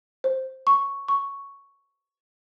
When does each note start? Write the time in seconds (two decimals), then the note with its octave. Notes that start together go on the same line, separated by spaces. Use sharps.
0.24 C5
0.67 C#6
1.08 C#6